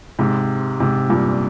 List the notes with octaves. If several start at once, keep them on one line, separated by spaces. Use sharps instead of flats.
G#2 C3
G#2 C3
G2 A#2